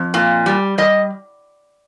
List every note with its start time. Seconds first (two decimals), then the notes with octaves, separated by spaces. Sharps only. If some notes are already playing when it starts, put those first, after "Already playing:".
Already playing: F2
0.14 A#2
0.46 G3
0.78 G3 D#5